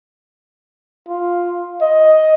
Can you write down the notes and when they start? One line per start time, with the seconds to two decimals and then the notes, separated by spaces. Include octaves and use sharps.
1.09 F4
1.81 D#5